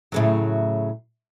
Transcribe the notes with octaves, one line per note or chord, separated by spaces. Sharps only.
A2 C#3 F#3